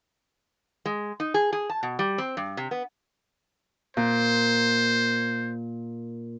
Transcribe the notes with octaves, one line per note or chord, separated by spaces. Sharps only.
G#3
D#4
G#4
G#4
A5
B2
G3
C4
G2
C3
B3
A#2 C5